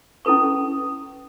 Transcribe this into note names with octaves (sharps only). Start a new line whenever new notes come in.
C#4 E4 A4 B4 C#6